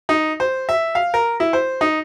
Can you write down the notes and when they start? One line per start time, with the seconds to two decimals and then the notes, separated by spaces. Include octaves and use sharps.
0.09 D#4
0.40 C5
0.69 E5
0.95 F5
1.14 A#4
1.40 E4
1.53 C5
1.81 D#4